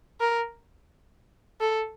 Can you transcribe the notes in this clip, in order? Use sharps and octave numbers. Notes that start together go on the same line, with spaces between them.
A#4
A4